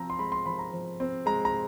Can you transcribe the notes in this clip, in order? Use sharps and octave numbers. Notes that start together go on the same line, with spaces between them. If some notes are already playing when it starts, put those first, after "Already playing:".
Already playing: F3 C4 A#5
C6
G#3 B5
C6
F3 B5
A#5
F3
C4
G#3 A#5
A#5